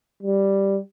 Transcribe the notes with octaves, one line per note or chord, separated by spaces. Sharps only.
G3